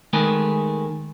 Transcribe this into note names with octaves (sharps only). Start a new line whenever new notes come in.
D#3 G#3 A3 G#4 A#4 B4